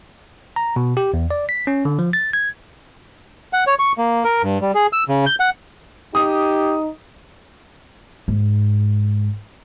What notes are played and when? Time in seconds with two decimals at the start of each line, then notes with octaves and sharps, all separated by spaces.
0.56 A#5
0.76 B2
0.97 G4
1.14 E2
1.31 D5
1.49 B6
1.67 C#4
1.85 D3
1.99 F3
2.13 A6
2.33 G#6
3.53 F#5
3.67 C#5
3.79 C#6
3.98 A#3
4.24 A#4
4.42 G2
4.61 G3
4.74 G#4
4.93 E6
5.09 C#3
5.26 G6
5.40 F#5
6.15 D#4 G4 D#6
8.28 G#2